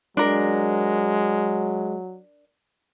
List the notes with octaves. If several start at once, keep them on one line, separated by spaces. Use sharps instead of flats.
F#3 G#3 D4 A#4